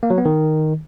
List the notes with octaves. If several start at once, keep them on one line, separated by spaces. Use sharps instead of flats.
A#3
F#3
B3
D#3